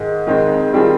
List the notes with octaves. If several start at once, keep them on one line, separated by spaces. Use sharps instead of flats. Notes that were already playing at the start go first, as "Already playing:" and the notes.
Already playing: G#2 D#3 G#3
F2 D#3 G#3 C4 D#4
D#3 G3 C4 F4 G#4